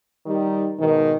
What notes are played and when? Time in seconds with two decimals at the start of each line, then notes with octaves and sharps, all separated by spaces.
0.26 D#3 G3 D#4
0.79 G#2 B2 D#3